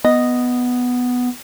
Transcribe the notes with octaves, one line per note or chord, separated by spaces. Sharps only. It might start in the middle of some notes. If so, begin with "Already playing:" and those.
B3 D#5